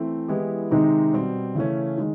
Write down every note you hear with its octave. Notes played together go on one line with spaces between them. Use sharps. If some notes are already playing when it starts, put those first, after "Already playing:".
Already playing: E3 A3 C4
E3 G#3 B3 E4 G4
C3 D#3 G#3 C4 D#4
B2 G3 C4
C#3 E3 A3 C#4
D#3 G#3